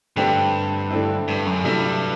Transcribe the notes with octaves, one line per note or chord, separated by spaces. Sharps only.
G2 D3 A3 C4 G4
D3 A3 C4 E4
G2
F#2
G2 C3 F#3 A3 E4